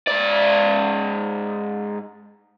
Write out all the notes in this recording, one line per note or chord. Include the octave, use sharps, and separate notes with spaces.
G#2 D5